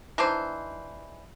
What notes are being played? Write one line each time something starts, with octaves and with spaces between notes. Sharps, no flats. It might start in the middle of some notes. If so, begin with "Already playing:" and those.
E3 D4 D#4 C5